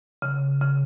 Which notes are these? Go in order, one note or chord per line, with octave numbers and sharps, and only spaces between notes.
C#3
C#3